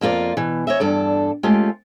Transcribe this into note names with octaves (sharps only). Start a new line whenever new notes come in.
F2 A#3 F4 A4 D5
B2 E3
C#5 D#5 E5
E2 G2 A4 D5
G#3 A3 C#4 F4 G4